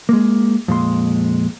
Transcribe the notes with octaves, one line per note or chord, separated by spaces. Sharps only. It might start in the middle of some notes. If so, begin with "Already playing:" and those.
G#3 A#3
F2 A#2 G#3 C6